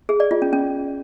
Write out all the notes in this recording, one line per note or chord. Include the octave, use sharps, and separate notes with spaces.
G#4
D5
F4
C#4
C#4